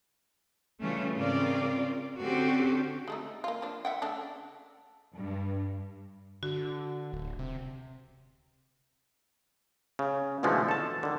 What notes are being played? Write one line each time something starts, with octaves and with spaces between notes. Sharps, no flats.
C#3 E3 G3 A3 C#4 F4
G#2 C#3 C4 F4 A#4 D5
D3 C4 C#4 F#4 G4 A4
G#3 A3 D#4
A#3 F4
F3 D4
E5 F#5 G5
C#3 A3 D4
G2
D3 F#4
D1
C3
C#3
B2 D3 E3 F3 G#3 A3
A4 A5
D3 D#3